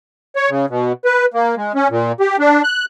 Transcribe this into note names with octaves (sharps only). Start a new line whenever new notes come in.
C#5
C#3
B2
B4
A#3
G#3
C#4
A#2
G4
D4
F#6